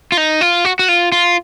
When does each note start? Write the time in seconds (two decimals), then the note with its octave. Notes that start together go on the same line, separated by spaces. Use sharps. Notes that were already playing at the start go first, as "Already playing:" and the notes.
0.12 F4
0.17 D#4
0.41 F4
0.65 F#4
0.79 F#4
0.89 F4
1.12 F4